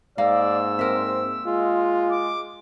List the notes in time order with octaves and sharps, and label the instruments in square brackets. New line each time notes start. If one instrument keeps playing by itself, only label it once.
[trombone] G#2 [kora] A#3 [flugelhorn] D5 [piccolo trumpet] E6
[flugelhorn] C4 [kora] A#4 E5
[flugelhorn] G#3 [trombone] F4
[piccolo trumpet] D6